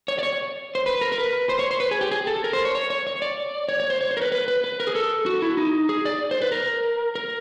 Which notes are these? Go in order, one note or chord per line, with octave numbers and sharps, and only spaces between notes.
C#5
D5
C#5
C5
B4
A#4
A#4
B4
C5
C#5
C5
B4
G#4
G4
G#4
A4
A#4
C5
C#5
C#5
C#5
C#5
D5
C#5
C#5
C5
C#5
C5
A#4
B4
B4
B4
B4
A#4
G#4
A4
F#4
E4
D#4
G#4
D5
C5
B4
A#4
A#4